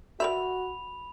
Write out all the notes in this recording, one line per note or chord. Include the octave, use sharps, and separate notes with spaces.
F#4 A#4 D5 E5 B5 F7